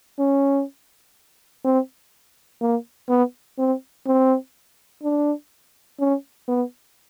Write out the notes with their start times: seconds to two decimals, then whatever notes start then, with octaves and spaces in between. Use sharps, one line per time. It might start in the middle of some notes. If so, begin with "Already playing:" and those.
0.19 C#4
1.65 C4
2.61 A#3
3.09 B3
3.58 C4
4.07 C4
5.03 D4
6.00 C#4
6.48 B3